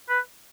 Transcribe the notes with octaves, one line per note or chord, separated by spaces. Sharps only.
B4